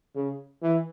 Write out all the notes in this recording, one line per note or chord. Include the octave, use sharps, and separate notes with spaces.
C#3
E3